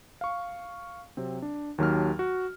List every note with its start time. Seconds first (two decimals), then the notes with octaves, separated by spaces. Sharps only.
0.21 F5 C#6
1.17 C3 F#3 C4
1.42 D4
1.78 D#2 D#3 F#3 G4 A5 F6
2.19 F#4